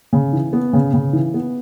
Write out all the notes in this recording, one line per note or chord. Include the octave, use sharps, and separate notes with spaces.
C#3
E3
B3
C#3
C#3
E3
B3